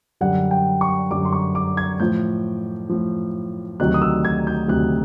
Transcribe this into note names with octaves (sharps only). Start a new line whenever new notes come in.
F#2 D3 G3 F#5
G5
C#6
F#2 D3 G3 D6
C6
C#6
D6
G#6
A2 F3 G6
A2 F3
D2 C3 D#3 F#3 F#6
D#6
E6
G#6
G6
D2 C3 D#3 F#3 F#6